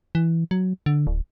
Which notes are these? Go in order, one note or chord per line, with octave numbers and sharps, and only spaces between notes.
E3
F#3
D3
D1